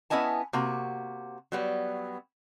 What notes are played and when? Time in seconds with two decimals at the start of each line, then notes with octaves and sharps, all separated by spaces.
0.10 B3 C#4 E4 D#5 G#5 A5
0.53 C3 A#3 F#4
1.52 F#3 G3 B3